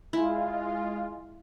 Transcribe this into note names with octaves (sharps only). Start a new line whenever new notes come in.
G#3 E4 F4